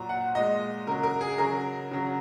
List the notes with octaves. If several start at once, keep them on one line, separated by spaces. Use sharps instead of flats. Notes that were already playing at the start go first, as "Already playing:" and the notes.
Already playing: A#2 F#3 A#5
F#5
A#2 G#3 D#5
C#3 F#3 A#4
A#4
G#4
C#3 F#3 A#4
C#3 F#3